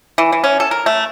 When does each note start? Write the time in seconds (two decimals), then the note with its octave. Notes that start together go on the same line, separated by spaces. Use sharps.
0.18 E3
0.32 E3
0.44 C#4
0.60 A4
0.71 A#4
0.86 A3